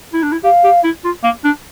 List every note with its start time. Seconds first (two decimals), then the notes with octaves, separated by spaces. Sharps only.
0.13 E4
0.23 D4
0.32 E4
0.44 G4 F5
0.64 G4
0.84 E4
1.04 F4
1.24 A#3
1.44 D4